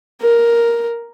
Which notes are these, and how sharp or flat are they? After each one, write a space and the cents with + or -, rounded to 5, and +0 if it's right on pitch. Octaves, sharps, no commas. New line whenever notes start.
A#4 +5